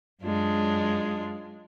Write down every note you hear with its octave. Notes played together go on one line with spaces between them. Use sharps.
F#2 G#3 D4 F4